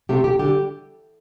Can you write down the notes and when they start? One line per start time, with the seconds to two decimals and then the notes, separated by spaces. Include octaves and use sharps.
0.09 C3 A3 G4
0.24 G4
0.39 D3 G3 G4